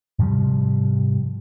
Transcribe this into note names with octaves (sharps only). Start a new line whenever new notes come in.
G#2 C3 F3 G3